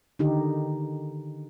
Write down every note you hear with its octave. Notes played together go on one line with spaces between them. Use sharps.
D3 D#3 D#4 G4